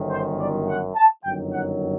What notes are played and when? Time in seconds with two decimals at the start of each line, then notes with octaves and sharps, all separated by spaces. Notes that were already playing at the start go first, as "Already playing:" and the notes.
Already playing: G1 F#2 D#3
0.10 C5
0.39 D5
0.68 F#5
0.96 A5
1.24 G1 F#2 D#3 F#3 G5
1.52 F#5